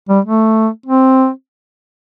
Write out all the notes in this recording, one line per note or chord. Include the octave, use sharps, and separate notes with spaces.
G3
A3
C4